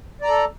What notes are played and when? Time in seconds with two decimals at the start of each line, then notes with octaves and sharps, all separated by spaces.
0.21 D5
0.24 A#5
0.28 A4